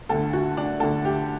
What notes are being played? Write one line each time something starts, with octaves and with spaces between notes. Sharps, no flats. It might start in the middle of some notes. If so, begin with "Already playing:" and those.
D2 D3 A4
F#4
D4
D2 D3 A4
G4